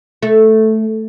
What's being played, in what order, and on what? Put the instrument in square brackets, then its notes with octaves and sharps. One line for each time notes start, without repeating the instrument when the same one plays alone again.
[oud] A3